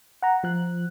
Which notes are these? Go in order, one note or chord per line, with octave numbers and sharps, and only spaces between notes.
F#5 A#5
F3 F#6